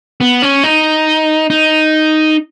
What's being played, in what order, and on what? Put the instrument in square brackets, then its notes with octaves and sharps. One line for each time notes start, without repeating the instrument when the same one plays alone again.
[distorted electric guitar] B3
C#4
D#4
D#4